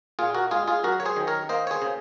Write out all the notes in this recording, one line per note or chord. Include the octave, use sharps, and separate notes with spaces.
A#2 F4 G#4
F#4 A#4
G#3 F4 G#4
F4 G#4
F#2 F#4 A#4
C#5
G#4 C5
D#3
A#4 C#5
A#3 C5 D#5
C#5
G#4 C5
C#3